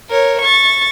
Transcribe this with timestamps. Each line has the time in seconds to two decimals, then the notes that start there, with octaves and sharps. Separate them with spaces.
0.10 A#4 C#5
0.41 C#6 A6